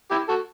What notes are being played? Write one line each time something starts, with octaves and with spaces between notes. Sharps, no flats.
E4 G4
F#4 A4